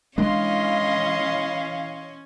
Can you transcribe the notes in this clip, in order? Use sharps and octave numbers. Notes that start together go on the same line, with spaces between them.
E3 G#3 C#4 D4 D#5 F5 C6